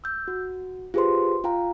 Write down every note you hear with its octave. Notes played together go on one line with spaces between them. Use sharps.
E6 G6
F#4
F4 G4 G#4 B4 C5 C6
F4 F5 G5 A#5